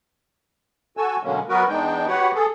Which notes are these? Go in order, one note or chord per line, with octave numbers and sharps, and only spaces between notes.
F#4 A4 G#5 E6
B2 D3 F#3 G#3 A#3 C#4
F#3 B3 F#4 A#4 B4
E2 G#3 D4 D#4 G5
F#4 G4 B4 C#5 F#5
G#4 A4